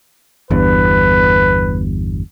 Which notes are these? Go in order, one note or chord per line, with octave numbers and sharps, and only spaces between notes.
G1 E2 G2 B4